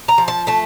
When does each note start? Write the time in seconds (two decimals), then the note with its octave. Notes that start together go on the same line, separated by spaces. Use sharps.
0.08 A#5
0.18 F3
0.28 A5
0.47 A3 A5